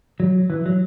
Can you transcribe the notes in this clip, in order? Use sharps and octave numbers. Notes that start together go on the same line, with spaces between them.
F#3
E3
F#3